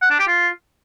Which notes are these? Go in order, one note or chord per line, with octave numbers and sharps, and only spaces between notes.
F#5
D4
G4
F4